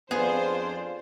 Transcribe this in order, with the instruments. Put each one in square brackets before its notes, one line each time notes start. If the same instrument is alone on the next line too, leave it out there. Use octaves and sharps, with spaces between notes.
[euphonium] F2 [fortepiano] B3 [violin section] D4 F4 C5 [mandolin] G#4